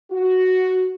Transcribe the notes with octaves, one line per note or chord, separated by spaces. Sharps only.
F#4